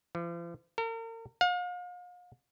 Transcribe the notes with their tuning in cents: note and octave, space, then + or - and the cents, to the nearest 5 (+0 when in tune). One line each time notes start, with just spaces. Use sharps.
F3 -45
A#4 -40
F5 +40